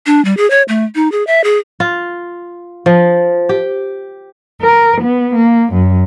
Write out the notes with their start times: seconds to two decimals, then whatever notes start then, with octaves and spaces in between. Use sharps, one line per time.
0.06 D4
0.25 G3
0.37 G#4
0.50 C#5
0.68 A3
0.95 D#4
1.12 G#4
1.27 E5
1.44 G#4
1.80 F4
2.86 F3
3.49 G4
4.61 A#4
5.01 B3
5.33 A#3
5.73 F#2